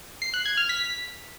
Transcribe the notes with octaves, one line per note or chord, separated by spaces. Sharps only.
C7
F#6
G#6
F6
B6